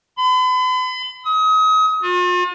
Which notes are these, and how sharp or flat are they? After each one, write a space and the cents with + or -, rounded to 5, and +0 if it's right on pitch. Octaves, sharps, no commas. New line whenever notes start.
B5 +45
D#6 +35
F4 +45